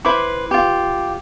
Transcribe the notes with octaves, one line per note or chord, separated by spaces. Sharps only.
E4 B4 C5 D6
F4 G4